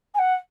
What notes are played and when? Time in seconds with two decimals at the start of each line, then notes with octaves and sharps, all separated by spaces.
0.14 G#5
0.19 F#5